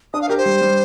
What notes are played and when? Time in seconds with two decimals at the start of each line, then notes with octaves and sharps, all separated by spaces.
0.14 D4 D#6
0.21 F5
0.29 G4 A#4
0.37 C5
0.46 G3
0.62 G3